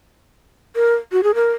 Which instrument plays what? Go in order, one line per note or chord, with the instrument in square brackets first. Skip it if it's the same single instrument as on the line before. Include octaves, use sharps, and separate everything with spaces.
[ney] A#4
F#4
G#4
A#4